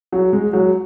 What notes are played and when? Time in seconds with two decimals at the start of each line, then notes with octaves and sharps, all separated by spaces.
0.12 F#3
0.33 G#3
0.53 F#3